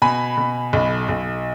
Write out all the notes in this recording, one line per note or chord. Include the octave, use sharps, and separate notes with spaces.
B2 G#5 B5
B2
B1
B1